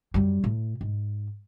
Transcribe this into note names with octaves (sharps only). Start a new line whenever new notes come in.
F#2 G3
A2
G#2